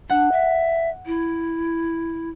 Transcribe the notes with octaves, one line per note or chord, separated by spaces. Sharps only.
D4 F#5
E5
E4